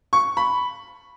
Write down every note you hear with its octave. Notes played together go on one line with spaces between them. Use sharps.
C#6
B5